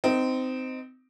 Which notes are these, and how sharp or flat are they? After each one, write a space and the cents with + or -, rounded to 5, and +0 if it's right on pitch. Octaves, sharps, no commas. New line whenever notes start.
C4 -20 D#4 +0